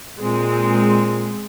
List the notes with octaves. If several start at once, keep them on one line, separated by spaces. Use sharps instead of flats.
A#2 G#3 C4